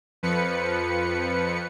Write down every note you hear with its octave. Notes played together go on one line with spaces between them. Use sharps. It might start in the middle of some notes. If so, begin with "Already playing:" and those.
F2 F3 B4 C#7